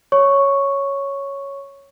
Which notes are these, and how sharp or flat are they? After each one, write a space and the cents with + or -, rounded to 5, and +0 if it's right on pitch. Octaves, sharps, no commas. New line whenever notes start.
C#5 +0 C#6 +0